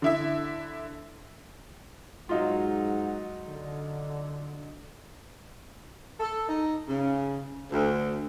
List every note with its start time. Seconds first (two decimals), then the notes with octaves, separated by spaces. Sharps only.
0.02 D3 E4 E5
2.29 G#2 F#3 D#4 F4 F#5
3.48 D3
6.19 A4
6.48 D#4
6.88 C#3
7.71 D2